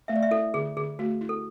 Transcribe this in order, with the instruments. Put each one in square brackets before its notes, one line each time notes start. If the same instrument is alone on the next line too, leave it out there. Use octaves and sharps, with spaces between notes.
[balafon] A3 [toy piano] E5
[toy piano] D5
E5
[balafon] E4 [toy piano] A4
[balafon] D3 [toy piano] G#4
[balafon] D3 [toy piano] G#4
[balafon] A3 [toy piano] F#4
[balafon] E4
[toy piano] A4